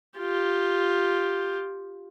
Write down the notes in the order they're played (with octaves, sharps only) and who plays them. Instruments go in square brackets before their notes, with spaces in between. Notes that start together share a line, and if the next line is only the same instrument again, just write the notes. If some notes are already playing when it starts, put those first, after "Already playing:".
[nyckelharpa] F4 G4